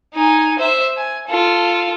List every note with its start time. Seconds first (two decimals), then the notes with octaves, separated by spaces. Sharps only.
0.14 D#4 G#5
0.59 C5 E5
0.97 G#5
1.27 F4 A4